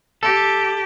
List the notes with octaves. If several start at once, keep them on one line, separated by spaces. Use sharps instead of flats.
G4 A4